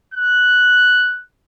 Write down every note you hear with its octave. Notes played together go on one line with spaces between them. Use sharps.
F#6